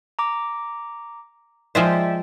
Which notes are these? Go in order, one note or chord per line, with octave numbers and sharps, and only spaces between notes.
A#5 D6
F3 G#3 C5 D5 E5 G5